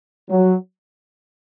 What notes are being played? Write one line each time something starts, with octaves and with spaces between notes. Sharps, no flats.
F#3